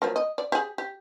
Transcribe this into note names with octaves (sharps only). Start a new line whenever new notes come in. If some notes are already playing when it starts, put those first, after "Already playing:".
F3 F#3 A#3
D#5
D5
G4 G#4
G4